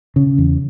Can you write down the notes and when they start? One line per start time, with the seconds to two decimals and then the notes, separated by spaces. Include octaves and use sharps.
0.16 C#3
0.38 E2